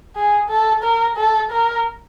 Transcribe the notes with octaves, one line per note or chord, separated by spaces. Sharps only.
G#4
A4
A#4
A4
A#4